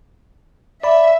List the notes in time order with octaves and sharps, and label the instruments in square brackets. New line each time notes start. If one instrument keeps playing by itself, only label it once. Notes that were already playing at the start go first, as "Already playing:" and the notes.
[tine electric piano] D5 B5 [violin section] E5